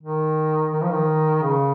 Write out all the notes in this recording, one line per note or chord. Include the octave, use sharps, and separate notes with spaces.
D#3
D#3
F3
D#3
C#3